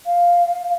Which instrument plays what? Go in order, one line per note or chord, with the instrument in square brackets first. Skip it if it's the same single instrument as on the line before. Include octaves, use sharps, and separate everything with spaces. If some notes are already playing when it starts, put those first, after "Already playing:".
[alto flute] F5